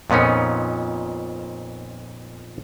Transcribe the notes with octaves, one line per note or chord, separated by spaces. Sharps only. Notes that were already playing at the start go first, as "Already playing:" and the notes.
F2 A#2 B3 C#4 D#4